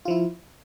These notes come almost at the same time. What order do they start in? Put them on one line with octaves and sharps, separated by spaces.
F4 F3 E4